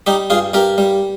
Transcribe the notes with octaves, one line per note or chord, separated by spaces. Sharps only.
G3 D#4 G4
G2 F4 G#4
G2 G4 A#4
G3